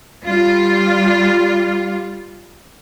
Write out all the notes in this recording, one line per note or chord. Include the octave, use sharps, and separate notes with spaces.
G3 F4